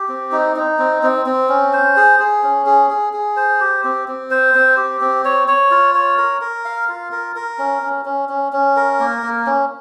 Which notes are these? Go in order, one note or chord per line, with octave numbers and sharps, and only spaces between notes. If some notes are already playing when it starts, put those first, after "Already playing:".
Already playing: G4
C4
D#4
D#4
C4
C4
C4
C#4
C5
G#4
G#4
C#4
G#4
G#4
G#4
C5
G4
C4
C4
C5
C4
G4
C4
C#5
C#5
F4
C#5
A#4
A#4
F5
F4
A#4
A#4
C#4
C#4
C#4
C#4
C#4
A#4
A#3
A#3
C#4